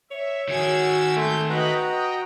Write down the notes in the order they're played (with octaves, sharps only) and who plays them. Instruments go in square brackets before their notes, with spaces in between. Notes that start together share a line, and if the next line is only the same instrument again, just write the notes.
[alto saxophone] C#5 [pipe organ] E5
[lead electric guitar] D#3 G#4 [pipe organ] F#4 E6 G#6
[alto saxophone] A3 [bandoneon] C6 [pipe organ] G6
[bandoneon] F#4 F#5 A#5 [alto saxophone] B4 [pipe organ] D#5 G5 B5
[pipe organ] D#5 G5